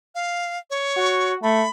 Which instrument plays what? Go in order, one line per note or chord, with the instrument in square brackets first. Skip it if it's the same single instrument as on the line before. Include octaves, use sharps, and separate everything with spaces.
[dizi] F5
C#5
[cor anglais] F#4
[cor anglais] A3 [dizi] B5